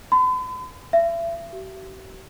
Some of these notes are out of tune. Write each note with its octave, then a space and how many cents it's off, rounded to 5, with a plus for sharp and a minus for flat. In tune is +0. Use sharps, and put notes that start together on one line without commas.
B5 +45
E5 +35
G4 -45